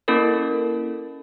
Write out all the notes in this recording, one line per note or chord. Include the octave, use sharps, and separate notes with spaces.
A#3 C#4 E4 A4 A#4